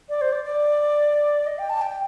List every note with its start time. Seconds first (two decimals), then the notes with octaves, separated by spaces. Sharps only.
0.09 D5
0.21 C5
0.33 D5
0.44 D5
1.46 D#5
1.59 G5
1.70 A5
1.82 G5